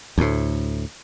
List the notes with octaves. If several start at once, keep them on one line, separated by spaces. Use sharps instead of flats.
D2 A2